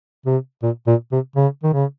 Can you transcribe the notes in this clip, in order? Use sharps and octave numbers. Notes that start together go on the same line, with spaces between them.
C3
A#2
A#2
C3
C#3
D#3
C#3